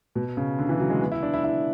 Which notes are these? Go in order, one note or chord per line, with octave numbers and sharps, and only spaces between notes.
B2
C#3
D3
E3
F#3
G#3
B3
E4
D4
E4
E4